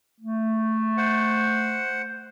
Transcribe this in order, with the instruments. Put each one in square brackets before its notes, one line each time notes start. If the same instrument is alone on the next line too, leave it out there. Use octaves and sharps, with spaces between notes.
[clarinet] A3
[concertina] C5 F#5